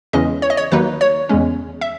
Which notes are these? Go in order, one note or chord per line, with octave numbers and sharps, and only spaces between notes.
E2 C#3 E3 G#3 C#4 D#5
C#5
D#5
C#5
D#2 D#3 F#3 A#3 D#4 B4
C#5
E2 C#3 G#3 C#4
E5